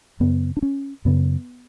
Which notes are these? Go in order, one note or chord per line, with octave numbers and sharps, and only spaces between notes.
F#2 C#3 B3
D4
C#4
F#2 C#3 B3